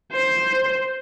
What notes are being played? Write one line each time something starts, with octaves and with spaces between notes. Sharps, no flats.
C5